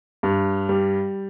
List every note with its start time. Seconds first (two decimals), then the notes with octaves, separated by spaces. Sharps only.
0.23 G2
0.69 G3